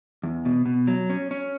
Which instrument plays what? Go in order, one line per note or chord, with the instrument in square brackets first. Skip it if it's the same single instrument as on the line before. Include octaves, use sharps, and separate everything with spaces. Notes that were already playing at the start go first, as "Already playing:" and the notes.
[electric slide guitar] E2
B2
B2
F#3
C#4
C#4